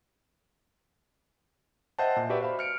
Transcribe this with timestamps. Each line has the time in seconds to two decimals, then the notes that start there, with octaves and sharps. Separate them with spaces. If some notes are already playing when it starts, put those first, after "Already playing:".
1.99 C5 D#5 E5 F#5 G5 A5
2.16 A#2
2.29 F#4 G4 B4 D5 E5
2.41 C5 F5 B5
2.59 F6 C#7 D7